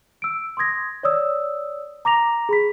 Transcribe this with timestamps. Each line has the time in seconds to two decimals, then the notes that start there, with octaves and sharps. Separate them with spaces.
0.22 E6 D7
0.57 C6 D6 D#6 G#6 A#6
1.03 C#5 D5 D#6 E6
2.05 A#5 D6 A#6 F7
2.49 G#4 B5 B6